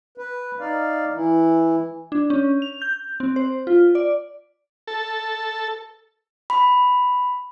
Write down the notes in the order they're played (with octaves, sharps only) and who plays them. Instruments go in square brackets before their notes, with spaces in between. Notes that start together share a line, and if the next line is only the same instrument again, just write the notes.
[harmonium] B4
D#4 D5 F5
E3 E4
[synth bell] D4
C#4
F7
G6
C4
C5
F4
D5
[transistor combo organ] A4
[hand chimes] B5